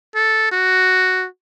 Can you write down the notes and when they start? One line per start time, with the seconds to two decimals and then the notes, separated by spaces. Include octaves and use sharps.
0.15 A4
0.52 F#4